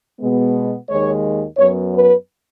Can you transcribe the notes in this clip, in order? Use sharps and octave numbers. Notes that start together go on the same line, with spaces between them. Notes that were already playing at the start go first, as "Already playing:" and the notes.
B2 G#3 B3
D#2 D#3 G#3 C#5
F#2 F#3 B3 C#5
B4